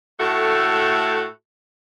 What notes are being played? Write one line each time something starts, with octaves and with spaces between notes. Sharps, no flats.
A2 A3 F#4 A4